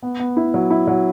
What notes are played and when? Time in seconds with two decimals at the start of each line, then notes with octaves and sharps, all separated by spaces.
0.02 B3
0.20 B3
0.37 E4
0.54 F#3
0.70 E4
0.87 F#3